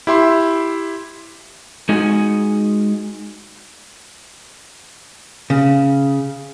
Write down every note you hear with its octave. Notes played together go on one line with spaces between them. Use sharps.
E4 G4 E5 C6
G#3 D#4 F#4 G#4 D#5 G#5
C#3